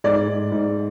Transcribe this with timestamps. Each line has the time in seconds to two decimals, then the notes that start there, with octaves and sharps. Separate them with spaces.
0.04 G#2 D5
0.28 G#2
0.52 G#2